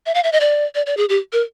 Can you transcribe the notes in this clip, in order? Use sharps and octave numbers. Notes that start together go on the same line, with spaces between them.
E5
F5
E5
D#5
D5
D5
D5
G#4
G4
A#4